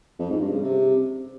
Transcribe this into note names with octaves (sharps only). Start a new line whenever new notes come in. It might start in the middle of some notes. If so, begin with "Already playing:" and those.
F2
G#2
G2
C#3
C3